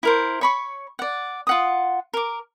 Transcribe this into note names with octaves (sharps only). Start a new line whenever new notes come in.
E4 A#4 C5
C#5 B5 C#6
D5 F#5
F4 F#5 D#6
A#4 D6